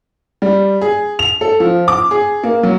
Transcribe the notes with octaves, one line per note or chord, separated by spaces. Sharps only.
G3
G#4
F7
A4
F3
D6
G#4
A#3
F#3